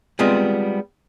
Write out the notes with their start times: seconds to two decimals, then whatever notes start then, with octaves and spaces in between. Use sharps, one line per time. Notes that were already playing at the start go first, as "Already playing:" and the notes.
0.19 G3 G#3 B3 C4 F4